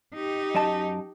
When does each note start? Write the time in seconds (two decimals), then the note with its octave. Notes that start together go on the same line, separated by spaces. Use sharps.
0.14 D#4 G4
0.55 F#2 D#5 A5